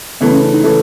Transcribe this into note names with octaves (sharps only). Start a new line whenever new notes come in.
C#3 E3 A3 B3
C#4
D4
D#4
C#3 E3 A3 A4